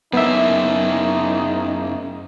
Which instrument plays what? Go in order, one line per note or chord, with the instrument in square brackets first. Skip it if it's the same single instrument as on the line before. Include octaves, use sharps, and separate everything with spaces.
[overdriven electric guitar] F#2 A#3 [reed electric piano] B3 E5 [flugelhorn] D#4